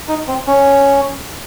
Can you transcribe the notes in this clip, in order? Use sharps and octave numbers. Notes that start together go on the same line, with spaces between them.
D#4
C4
C#4